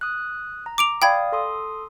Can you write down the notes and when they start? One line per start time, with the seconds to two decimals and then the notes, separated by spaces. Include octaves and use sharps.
0.01 D#6 F#6
0.66 A#5
0.78 D6 D7 F7
1.02 D5 F5 G5 B5 D#6 G#6
1.32 A4 C6 D#6